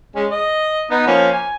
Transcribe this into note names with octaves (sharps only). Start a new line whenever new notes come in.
G#3 C#4
D#5
B3 D#4
F3 A#3 C#4
G#5